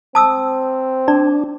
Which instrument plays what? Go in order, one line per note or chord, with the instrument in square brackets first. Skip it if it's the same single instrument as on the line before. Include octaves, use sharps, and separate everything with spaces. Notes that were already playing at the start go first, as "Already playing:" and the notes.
[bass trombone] C4 [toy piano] A5 D#6 E6
[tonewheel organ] D4 [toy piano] D5